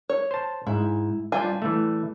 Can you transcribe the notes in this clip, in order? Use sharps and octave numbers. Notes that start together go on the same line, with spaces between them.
C#5
C5 A5
G#2 E4
G3 D4 F4 G#5
E3 A3